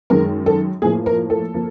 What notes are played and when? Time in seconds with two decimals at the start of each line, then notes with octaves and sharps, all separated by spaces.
0.10 F#2 D#3 G#3 A#4
0.46 A4
0.82 A2 F3 A#3 G#4
1.06 A#4
1.30 A4
1.54 F3 A#3